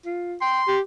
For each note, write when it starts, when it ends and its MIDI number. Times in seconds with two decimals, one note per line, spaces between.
0.05 0.35 65
0.41 0.62 79
0.41 0.76 84
0.67 0.81 67